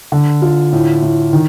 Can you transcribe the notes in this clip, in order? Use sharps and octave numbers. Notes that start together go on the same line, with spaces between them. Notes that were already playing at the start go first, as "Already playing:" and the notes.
D3
F4
A2
A2
D#3